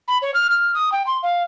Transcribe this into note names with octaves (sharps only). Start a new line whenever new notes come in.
B5
C#5
F6
F6
D#6
G5
C6
F5